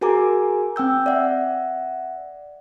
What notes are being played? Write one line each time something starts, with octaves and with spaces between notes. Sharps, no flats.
F#4 G#4 A#4 G#5 A#5 D6
C4 G5 E6 G6
D5 E5 F#5